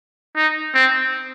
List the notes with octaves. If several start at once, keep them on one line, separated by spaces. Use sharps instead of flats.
D#4
C4